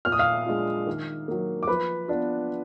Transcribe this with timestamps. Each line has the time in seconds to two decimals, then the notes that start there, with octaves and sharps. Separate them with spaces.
0.05 A#2 F6
0.12 D#6
0.19 F5 F6
0.46 G#3 D4 F4
0.86 D#3
1.28 F#3 A#3
1.63 D6
1.67 F3 B4 B5
2.08 B3 D4 F4